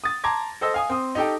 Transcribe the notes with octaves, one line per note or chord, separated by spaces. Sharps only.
D#6 A6
A5 A#5 C6 D6 G#6 A#6
A4 C5 D#5 E6
F5 G#5 D#6
C4 D#6
D#4 G4 A4 G5